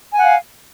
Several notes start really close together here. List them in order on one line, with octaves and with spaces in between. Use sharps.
G#5 F#5 F5